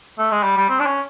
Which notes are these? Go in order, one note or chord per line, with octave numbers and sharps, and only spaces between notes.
A3
G#3
G3
G3
C4
D4
C#4